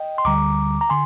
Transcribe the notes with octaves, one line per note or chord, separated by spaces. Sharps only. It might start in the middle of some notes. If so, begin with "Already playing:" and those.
Already playing: D#5 G5
C6
D2 D3 G3 A#5 D6
A#5
D3 G#5 C6